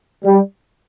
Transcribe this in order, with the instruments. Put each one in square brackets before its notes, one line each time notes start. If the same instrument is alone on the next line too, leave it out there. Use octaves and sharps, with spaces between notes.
[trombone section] G3